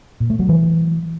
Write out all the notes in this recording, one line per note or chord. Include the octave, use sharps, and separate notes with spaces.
A#2
A3
F#3
E3